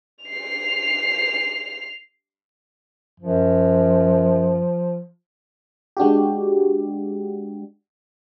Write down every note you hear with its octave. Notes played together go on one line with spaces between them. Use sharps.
C7 F7
F#2 F3
G#3 D4 F#4 G4